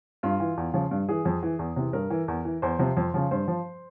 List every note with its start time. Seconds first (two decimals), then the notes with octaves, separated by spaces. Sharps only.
0.23 G2 F4
0.40 E3
0.57 E2
0.74 C#3 F3
0.91 G2
1.09 E3 G#4
1.25 F2
1.43 E3
1.59 E2
1.76 C3 E3
1.93 G2 A#4
2.10 E3
2.28 E2
2.45 E3
2.62 E2 C5
2.79 C3 F3
2.97 F2
3.14 C#3 F3
3.31 G2 C5
3.48 F3